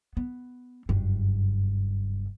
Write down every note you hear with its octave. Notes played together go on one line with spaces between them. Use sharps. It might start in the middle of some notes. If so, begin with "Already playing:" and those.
B3
F#1 G2